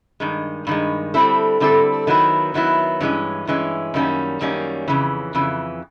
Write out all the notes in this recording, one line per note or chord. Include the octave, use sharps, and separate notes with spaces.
G2 D#3 G#3
G2 D#3 G#3
D3 G3 C4 E4 A4
D3 G3 C4 E4 A4
D#3 F#3 B3 E4
D#3 F#3 B3 E4
G2 E3 G#3 C#4
G2 E3 G#3 C#4
F#2 D#3 G3 A#3 C#4
F#2 D#3 G3 A#3 C#4
F2 C#3 E3
F2 C#3 E3